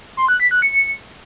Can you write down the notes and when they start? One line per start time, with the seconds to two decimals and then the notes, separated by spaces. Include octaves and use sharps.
0.17 C6
0.28 F#6
0.40 B6
0.51 F#6
0.62 C#7